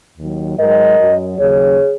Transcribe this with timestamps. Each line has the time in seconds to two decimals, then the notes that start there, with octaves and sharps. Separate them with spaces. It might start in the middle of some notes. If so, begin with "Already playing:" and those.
0.18 D#2 D#3 F#3
0.59 G#2 F#3 A#4 D#5
0.99 F#2 F#3
1.38 D#2 C#3 F#3 G#4 C#5